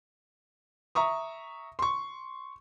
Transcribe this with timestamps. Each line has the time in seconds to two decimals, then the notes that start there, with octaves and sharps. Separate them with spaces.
0.95 E5 A#5 C#6 D#6
1.79 C6 C#6